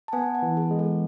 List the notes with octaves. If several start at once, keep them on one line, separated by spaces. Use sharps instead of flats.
A5
B3 G#5
F#5
E3
G#4
G#3
A4